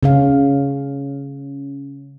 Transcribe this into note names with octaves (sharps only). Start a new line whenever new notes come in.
C#3 C#4 F5